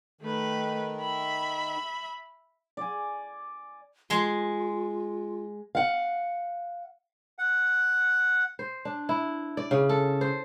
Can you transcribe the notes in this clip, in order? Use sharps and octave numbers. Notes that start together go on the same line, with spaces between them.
D#3 A3 B4
E5 B5
D5 G#5
G#3 F4 C6
F5 F#5
F#5
C5
D4
E4
D5
C#3
A4
C5